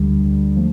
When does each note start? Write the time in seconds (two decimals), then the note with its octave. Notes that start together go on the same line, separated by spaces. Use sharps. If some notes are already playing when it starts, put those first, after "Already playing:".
Already playing: D2 D3 G3
0.56 F3 A3